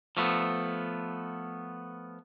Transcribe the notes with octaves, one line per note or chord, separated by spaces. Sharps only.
F3 A3 B3